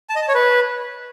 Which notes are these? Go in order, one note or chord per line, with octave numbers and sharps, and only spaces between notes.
A5
D#5
A5
C#5
B4